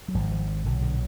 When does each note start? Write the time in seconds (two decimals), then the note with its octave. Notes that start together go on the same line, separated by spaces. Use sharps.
0.08 F#3
0.14 G#1 G#2 F3
0.31 F3
0.66 B1 A#2 D3
0.82 D3